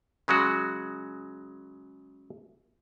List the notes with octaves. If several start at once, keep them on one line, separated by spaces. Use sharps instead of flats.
C#3 F#3 G#3 F#4